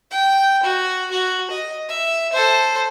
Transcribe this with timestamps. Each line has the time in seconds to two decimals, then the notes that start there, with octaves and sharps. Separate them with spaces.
0.11 G5
0.63 F#4
1.11 F#4
1.51 D#5
1.89 E5
2.33 A4 C5